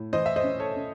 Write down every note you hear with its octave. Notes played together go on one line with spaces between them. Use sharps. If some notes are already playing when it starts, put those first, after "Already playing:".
Already playing: A2
E3 C5 D#5
E5
C5 D#5
C#4
A4 C#5
C#4